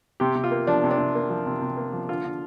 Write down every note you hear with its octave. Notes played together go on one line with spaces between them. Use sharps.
C3 G4
C3
F4
A#3
F3 D4
C3
D4
C3
A#3
F3
C3
C3
A#3
F3
D3 F4
D3